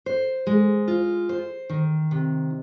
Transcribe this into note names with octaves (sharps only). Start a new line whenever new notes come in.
C5
G#3
F4
C5
D#3
C3